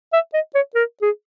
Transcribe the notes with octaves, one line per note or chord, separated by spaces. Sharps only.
E5
D#5
C#5
A#4
G#4